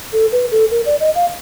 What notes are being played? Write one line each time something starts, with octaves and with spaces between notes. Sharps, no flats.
A4
B4
A4
A#4
D5
D#5
F5